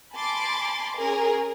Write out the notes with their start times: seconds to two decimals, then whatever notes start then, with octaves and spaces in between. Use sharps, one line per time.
0.13 G#5 A5 B5 C6 D6 A6
0.97 C#4 G#4 A#4 G#5